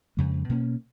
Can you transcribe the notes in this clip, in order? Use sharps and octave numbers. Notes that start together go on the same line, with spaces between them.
F2 C#3 G#3
B2 A#3 C#4